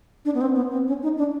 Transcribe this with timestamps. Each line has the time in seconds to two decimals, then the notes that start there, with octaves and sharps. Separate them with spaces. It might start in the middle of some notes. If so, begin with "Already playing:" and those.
0.25 D4
0.34 B3
0.41 C4
0.55 B3
0.71 C4
0.88 C#4
1.03 D#4
1.18 D4